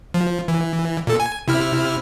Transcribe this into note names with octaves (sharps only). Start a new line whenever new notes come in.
F3
E3
A#2 A4
G#5
C3 E4 F6